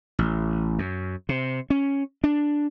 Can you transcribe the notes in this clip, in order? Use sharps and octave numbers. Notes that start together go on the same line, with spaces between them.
A1
F#2
C3
C#4
D4